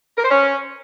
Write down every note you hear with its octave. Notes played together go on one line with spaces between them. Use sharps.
A#4
C5
C#4